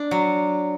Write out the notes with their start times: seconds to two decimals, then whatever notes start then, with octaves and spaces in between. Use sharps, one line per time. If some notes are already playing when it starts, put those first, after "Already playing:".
Already playing: D4
0.11 F#3